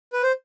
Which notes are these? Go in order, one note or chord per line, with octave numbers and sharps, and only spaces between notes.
B4
C5